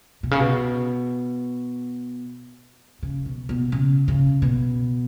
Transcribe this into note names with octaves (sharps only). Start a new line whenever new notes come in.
B2
C#3
B2
C#3
B2
B2
C#3
C#3
B2